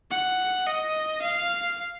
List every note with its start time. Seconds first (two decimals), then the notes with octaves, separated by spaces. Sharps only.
0.11 F#5
0.67 D#5
1.22 F5